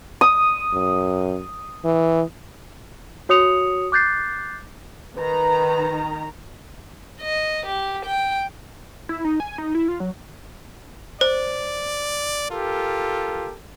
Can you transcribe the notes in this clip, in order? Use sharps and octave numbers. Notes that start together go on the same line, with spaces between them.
D#6
F#2
E3
F#4 C#5 D#6 C#7 F7
D6 F#6 G6 A6 C7
D#3 B4 A#5
D#5
G4
G5
E4
D#4
G#5
D#4
E4
F4
F#3
C5 D5
F4 G4 A4 A#4